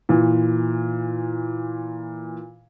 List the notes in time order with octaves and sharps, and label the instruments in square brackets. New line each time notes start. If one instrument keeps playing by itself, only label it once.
[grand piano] A#2 E3